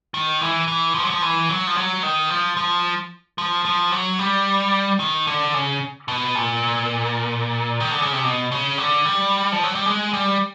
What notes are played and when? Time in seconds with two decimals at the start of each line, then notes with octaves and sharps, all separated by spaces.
0.14 D#3
0.41 E3
0.68 E3
0.95 F3
1.03 F#3
1.10 F3
1.22 E3
1.49 F#3
1.67 F3
1.76 F#3
2.03 D#3
2.30 F3
2.57 F3
3.38 F3
3.65 F3
3.92 F#3
4.19 G3
5.00 D#3
5.27 D3
5.54 C#3
6.08 B2
6.35 A#2
7.80 D#3
7.91 D3
8.02 C#3
8.13 C3
8.24 B2
8.52 C#3
8.78 D3
9.05 G3
9.52 F3
9.64 F#3
9.75 G3
9.86 G#3
10.13 G3